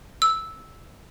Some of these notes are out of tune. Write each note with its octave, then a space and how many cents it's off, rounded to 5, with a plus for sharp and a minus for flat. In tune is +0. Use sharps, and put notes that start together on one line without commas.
E6 -10